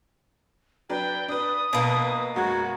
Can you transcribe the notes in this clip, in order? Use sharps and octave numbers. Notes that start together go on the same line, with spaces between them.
F#3 D4 B4 G5
D4 B4 D#6
A#1 B2 A#3 B4
F#2 G#3 F#4 G#6